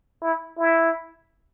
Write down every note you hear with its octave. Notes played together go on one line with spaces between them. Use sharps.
E4
E4